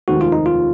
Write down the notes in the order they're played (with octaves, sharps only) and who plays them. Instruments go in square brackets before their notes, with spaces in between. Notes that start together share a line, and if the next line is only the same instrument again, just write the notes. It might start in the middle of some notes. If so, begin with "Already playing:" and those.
[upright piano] F1 D#2 D#3 G#3 C4 [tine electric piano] F#4
[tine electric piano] F4
D#4
F4